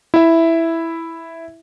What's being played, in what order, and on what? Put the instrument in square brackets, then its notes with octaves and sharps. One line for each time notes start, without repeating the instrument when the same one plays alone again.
[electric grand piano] E4 E5